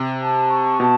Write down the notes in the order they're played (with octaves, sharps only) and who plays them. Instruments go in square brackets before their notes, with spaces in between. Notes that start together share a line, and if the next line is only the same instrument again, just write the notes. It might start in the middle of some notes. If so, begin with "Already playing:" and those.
Already playing: [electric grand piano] C3
[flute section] A5
C#6
[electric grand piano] B2 [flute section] A5